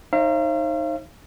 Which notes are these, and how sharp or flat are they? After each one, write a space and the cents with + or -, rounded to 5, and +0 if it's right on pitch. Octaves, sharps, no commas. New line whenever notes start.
D#4 +0 C5 +45 F5 -40